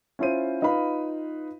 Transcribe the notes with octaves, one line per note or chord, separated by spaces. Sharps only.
C#4 E4 F4 C5 D#7
D#4 F4 B4 F5 B5